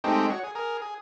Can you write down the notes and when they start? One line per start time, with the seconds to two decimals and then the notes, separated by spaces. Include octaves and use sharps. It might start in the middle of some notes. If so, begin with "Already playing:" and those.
0.04 G#3 A3 C4 D#4 G4
0.30 F#4 C#5
0.44 G#4
0.55 G#4 A#4
0.82 G#4